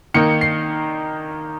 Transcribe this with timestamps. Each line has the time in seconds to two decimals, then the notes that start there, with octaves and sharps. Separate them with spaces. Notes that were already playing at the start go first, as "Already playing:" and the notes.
0.14 D#3 A#3 D#4 C#7
0.41 C7